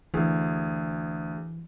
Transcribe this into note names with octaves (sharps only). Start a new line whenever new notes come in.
D2 E3 G#4